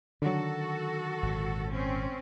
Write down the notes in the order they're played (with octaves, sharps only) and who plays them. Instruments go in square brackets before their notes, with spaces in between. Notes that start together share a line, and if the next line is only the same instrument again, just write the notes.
[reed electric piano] D3 F#3 [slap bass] D#3 [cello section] F#4 A4
[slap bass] G#1 A#2
[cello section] C4 C#4